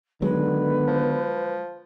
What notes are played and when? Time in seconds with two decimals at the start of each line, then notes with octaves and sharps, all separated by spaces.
0.22 D3 D#3 F#3 G#3 B3 B4
0.88 F3